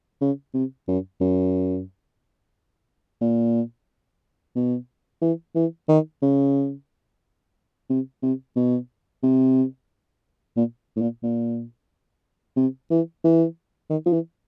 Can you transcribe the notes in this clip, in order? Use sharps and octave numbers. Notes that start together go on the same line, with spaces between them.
C#3
C3
F#2
F#2
A#2
B2
E3
E3
D#3
C#3
C3
C3
B2
C3
A#2
A2
A#2
A#2
C3
E3
E3
D#3
F3
E3